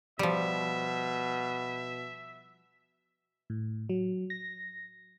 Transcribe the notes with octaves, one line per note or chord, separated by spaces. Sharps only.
B2 F3 G3 E5
A2
F#3
A#6